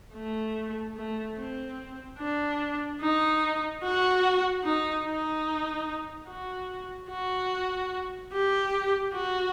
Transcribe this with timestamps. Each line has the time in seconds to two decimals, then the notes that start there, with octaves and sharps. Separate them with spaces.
0.14 A3
0.96 A3
1.38 C4
2.19 D4
3.01 D#4
3.83 F#4
4.64 D#4
5.05 D#4
6.28 F#4
7.10 F#4
8.32 G4
9.14 F#4